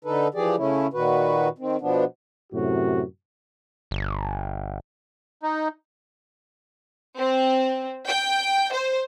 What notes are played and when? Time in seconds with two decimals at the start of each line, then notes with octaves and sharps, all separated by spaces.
0.05 D3 D#4 A4 B4
0.34 E3 F3 G4 G#4 D5
0.57 C#3 A3 C#4 E4
0.93 A#2 D#3 F#4 B4
1.58 D#3 C4
1.81 B2 F3 B3 D4
2.52 F#2 A2 C3 F#4
3.91 G1
5.43 D#4
7.19 C4
8.08 G5
8.73 C5